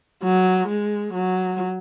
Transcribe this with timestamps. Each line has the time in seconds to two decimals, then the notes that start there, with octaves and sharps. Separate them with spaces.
0.23 F#3
0.68 G#3
1.13 F#3